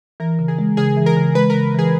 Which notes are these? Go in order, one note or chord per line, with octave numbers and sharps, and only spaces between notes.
E3 A#4
C#3
G#4
G#3
C#3 G#4
E3
A#4
C#3
G#3 B4
C#3 A#4
E3 G#4